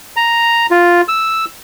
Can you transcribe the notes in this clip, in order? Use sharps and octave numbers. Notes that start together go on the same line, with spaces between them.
A#5
F4
E6